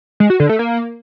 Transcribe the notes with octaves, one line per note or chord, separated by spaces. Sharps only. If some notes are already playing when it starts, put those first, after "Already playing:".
G#3
F#4
D3
A3
A#3